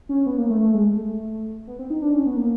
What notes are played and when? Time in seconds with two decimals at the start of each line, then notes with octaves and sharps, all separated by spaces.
0.09 C#4
0.26 B3
0.38 A#3
0.50 A3
0.63 A3
0.74 G#3
0.96 A3
1.67 B3
1.79 C4
1.90 D#4
2.02 D4
2.14 C#4
2.26 B3
2.37 A#3